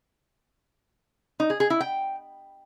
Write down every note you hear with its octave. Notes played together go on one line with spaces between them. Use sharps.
D#4
G#4
G#4
E4
G5